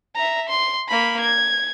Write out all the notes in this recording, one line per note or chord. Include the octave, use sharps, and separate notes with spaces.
E5 A#5
C6
A#3 B5
G#6